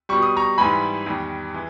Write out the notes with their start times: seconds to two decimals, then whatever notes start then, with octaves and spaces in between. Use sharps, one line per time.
0.09 B2 G3 C#6
0.22 D#6
0.37 A#5 C#6
0.58 G#2 E3 G3 G#5 B5
1.06 E2 D#3 G3
1.54 E3 G#3